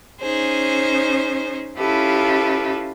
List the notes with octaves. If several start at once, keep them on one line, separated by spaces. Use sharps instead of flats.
C#4 D#4 G#4 C5
C#4 E4 F4 G4 A4 B4